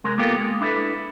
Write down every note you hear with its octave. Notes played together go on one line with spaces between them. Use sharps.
C2 G#3 A#4
A#3 B3 F4 G4 A4 A#4
G#3
D4 E4 G4 A4 B4